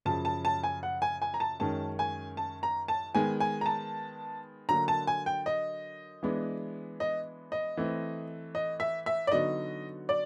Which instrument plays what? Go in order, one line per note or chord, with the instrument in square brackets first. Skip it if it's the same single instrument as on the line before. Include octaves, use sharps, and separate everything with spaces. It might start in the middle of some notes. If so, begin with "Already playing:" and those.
[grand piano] F#2 C#3 F3 [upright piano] A5
[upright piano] A5
A5
G#5
F#5
G#5
G#5
A#5
A5
[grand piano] F#2 D#3 G#3 C#4 [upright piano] A5
[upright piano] G#5
A5
A#5
A5
[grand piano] D#3 G#3 B3 [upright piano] G#5
[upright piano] G#5
A#5
A5
[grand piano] D3 F#3 A#3 [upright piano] A#5
[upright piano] A5
G#5
G5
D#5
[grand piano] E3 G#3 B3 D4
[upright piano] D#5
D#5
[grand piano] E3 A3 C4
[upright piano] D#5
E5
E5
D5
[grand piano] D3 F#3 B3 D#4 F#4 [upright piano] D#5
[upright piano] D5